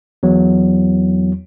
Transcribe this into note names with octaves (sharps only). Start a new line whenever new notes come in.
E2 F#3